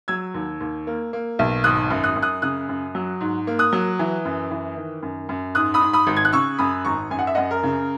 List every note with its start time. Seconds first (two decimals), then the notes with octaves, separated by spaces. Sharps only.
0.08 F#3 E6 G#6
0.34 D#2
0.61 D#2
0.87 A#3
1.13 A#3
1.39 B1
1.64 G#1 D#6 F#6
1.91 F#2
2.04 D#6 F#6
2.16 F#2
2.23 D#6 F#6
2.42 C#3 D#6 F#6
2.69 F#2
2.95 F#3
3.21 G#2
3.47 A#3
3.59 D#6 F#6
3.73 F#3
3.99 E3
4.25 F#2
4.51 E3
4.77 D#3
5.03 F#2
5.29 F#2
5.55 G#2 D#6 F#6
5.74 B5 D#6
5.81 G#2
5.93 B5 D#6
6.07 G#1
6.16 G#6
6.25 F#6
6.33 C#3 C#6 E6
6.58 F#2 B5 D#6
6.85 G#1 A#5 C#6
7.11 F#2 G#5
7.19 F#5
7.27 E5
7.35 F#2 D#5 F#5
7.51 A#4
7.63 C#3